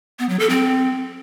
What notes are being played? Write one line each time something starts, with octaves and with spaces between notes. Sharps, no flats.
B3
F#3
A4
C4